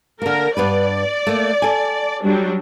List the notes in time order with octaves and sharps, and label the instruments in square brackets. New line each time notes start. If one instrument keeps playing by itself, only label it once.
[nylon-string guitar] D3 A#3 [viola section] A#4
[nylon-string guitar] G2 B3 B4 [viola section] D5
[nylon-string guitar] A3 A#3
A4 G#5
[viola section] F#3 G3 D4